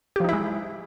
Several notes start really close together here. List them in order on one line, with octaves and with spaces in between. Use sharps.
G4 F3 D#4 E4 G#3